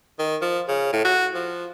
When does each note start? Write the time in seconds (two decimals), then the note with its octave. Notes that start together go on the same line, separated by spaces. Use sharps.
0.19 D#3
0.42 F3
0.68 C#3
0.93 A2
1.05 F#4
1.34 F3